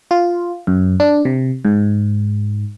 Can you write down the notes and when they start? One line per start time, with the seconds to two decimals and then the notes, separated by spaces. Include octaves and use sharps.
0.11 F4
0.67 F#2
1.00 D4
1.25 C3
1.65 G#2